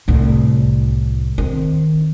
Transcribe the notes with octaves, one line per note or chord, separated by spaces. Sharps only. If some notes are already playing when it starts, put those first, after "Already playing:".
C2 A2
D#3 C4